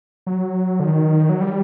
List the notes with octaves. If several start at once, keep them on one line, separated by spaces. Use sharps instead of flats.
F#3
D3
D#3
F#3
G3